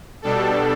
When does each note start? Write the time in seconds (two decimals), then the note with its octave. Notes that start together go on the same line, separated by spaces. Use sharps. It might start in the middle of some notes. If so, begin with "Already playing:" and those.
0.22 B2 G3 D4 A4